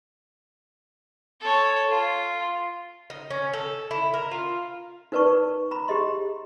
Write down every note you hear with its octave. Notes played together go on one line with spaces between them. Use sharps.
A4 C#5
F4
D#4
C#4
A4
E4
A#4
F4
D#4 A#4 B4 D5 A5 C#6
A#5 B5
G4 G#4 D#5 C6